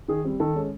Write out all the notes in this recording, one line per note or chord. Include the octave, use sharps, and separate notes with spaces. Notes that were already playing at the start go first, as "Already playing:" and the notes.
D#3 G#4
G3 C4
D#3 A4
G#3 C#4